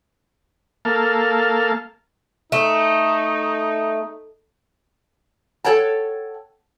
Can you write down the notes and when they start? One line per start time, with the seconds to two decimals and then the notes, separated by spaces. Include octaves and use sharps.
0.85 A#3 A4 F5
2.52 A3 D#4
5.64 A4 C#5 F#5 G5 A5